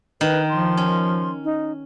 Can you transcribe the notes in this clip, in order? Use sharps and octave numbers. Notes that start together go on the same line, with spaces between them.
D#3 B4
F3 C6
C#4
D#4